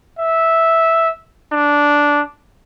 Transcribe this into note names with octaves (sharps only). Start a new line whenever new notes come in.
E5
D4